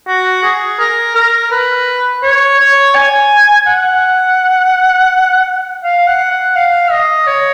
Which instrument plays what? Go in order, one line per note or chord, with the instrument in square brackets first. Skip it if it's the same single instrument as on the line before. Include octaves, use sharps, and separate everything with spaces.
[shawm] F#4
G#4
A#4
A#4
B4
C#5
C#5
G#5
F#5
F5
F#5
F#5
F5
D#5
C#5